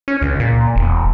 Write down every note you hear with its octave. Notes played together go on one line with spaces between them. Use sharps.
C#4
C#2
A#2
E1